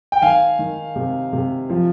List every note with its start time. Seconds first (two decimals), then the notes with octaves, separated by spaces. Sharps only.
0.12 G5
0.22 D#3 F5 G#5
0.59 D#3
0.96 C3
1.33 C3
1.70 F3